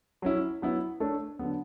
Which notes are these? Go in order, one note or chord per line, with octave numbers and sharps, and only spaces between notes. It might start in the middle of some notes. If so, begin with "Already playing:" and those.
F#3 C#4 E4
F#3 B3 E4
A3 D4 A4 C#5
D3 F#3 B3